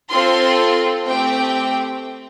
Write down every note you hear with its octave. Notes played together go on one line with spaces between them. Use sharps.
C4 F4 A4 C6
A3 C4 G4 G5